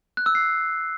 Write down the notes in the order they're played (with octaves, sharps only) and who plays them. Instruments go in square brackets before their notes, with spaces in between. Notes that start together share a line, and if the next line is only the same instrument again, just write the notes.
[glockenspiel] F#6
E6
C7